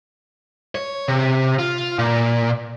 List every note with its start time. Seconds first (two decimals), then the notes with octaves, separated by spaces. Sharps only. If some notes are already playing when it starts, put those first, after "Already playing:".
0.75 C#5
1.08 C3
1.59 F4
1.99 A#2